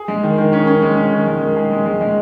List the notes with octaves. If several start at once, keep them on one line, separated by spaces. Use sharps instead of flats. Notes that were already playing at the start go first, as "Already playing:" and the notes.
Already playing: G#4
G#3
D#3
D#3
C#4
C#4
G#3
C#4
D#3
G#3
D#3
G#4
G#3
G#3
G#3